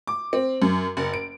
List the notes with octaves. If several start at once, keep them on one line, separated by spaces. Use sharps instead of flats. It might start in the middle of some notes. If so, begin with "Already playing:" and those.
D6
C4
F#2
F#1
D7